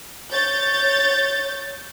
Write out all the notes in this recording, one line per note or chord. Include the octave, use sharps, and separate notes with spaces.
C#5 G6 A6